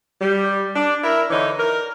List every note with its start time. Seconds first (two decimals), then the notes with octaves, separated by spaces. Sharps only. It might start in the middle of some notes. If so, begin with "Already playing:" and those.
0.21 G3
0.75 D4
1.03 E4 A#4
1.30 D3 E3 D#4 C#5
1.59 A#4